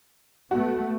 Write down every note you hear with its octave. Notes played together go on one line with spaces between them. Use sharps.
A3 B3 F#4